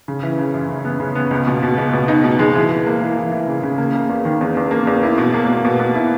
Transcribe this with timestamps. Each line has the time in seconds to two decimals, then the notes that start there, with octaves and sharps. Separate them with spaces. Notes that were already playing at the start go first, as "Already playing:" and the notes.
0.08 C#3
0.23 E3
0.39 C#3
0.54 F#2
0.69 C#3
0.85 B3
1.00 C#3
1.15 B3
1.31 C#2
1.47 B2
1.63 B2
1.78 C#2
1.93 B2
2.08 D#4
2.24 B2
2.39 G#3
2.55 E3
2.70 E3
2.87 A#3
3.01 E3
3.17 E3
3.32 E3
3.48 C#3
3.63 C#3
3.78 A#3
3.94 A#3
4.09 E2
4.25 D#3
4.41 E2
4.57 E2
4.71 A#3
4.87 E2
5.03 E4
5.18 B2
5.34 A#3
5.49 B2
5.65 B2
5.80 B2
5.95 E4